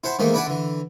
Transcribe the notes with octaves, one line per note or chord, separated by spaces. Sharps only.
E4 C5 F#5 A5
G#2 D#3 E3 A3 A#3
D4 E4 B4 D5 F#5 A5
D3 E3